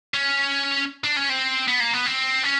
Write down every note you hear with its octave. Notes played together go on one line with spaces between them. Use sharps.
C#4
D4
C#4
C4
B3
A#3
B3
C4
C#4